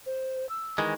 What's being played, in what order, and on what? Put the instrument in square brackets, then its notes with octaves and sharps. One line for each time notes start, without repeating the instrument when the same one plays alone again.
[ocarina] C5
E6
[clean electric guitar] D#3 E3 G#3